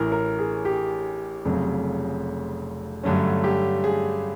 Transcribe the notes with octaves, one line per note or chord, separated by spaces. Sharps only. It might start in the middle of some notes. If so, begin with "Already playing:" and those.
Already playing: A1 A2 E3 A#4
A#4
G#4
G4
F1 F2 C#3 F#3
G2 D3 F#3 A3 C#4
G4
G#4